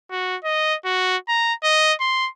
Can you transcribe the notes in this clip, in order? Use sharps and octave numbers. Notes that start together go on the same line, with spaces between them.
F#4
D#5
F#4
A#5
D#5
C6